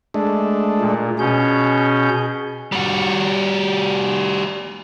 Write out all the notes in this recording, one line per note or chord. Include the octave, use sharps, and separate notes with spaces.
G#3 A3 D4
A#2
B2 C#4 G#4 G6
G3 F#4